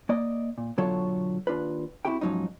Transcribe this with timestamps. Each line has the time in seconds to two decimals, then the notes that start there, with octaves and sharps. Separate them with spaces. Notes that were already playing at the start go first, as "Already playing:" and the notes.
0.09 A#3 D5 D#5
0.58 A#2
0.78 B2 D3 F#3 F4 A4 C#5
1.47 D#2 D4 F4 B4
2.05 C4 E4 F#4 G4 G5
2.21 G#2 F3 F#3 C#4 D#4